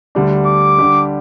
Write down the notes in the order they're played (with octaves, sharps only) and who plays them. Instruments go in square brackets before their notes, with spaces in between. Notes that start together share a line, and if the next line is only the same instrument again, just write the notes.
[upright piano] D2 D3 G3 D4
[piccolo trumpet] D6
[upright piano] D3 G3 D4 G4